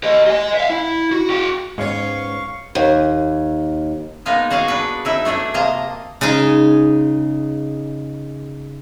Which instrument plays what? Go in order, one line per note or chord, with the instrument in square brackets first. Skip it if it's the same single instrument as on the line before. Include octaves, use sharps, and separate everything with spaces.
[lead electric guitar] G4 D#5
D#5 G#5
E5 F5
E4
F#4
F#4 G5
[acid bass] G#2 [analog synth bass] G#3 [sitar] B3 C#4 C#5 [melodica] F5 C#6
[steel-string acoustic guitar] D#2
[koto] G#3 A#3 B3 D#4
F#4 G#4 D#5 F5
D4 B4
D#4 E4 E5
A3 D4 G#4 E5
C3 A#3 D#5 A5 A#5
[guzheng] C#3 G#3 D#4 G#4